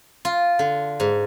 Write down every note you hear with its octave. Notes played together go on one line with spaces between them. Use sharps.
F4
D3
G#2